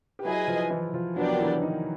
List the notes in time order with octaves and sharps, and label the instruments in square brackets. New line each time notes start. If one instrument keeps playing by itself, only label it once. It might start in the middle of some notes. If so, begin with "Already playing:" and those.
[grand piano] G4
[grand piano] F#3 F#4 [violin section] E4 G#4 B4 D#5 G#5
[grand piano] F3 F4
E3 E4
F3 F4
[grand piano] F#3 F#4 [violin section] B3 D4 G4 A#4 D5
[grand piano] E3 E4
D#3 D#4